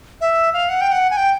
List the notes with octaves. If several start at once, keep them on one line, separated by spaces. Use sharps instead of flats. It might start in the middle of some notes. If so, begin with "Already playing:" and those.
E5
F5
F#5
G5
F#5
G#5
G5